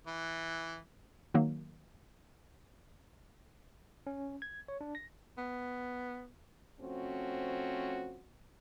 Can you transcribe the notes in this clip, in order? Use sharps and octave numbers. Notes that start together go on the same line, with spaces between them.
E3
D#3 F#3 A#3
C#4
G#6
C#5
D4
A#6
B3
F3 A3 C4 C#4 F#4